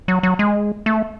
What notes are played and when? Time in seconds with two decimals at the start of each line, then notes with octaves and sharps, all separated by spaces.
0.08 F#3
0.23 F#3
0.39 G#3
0.86 A3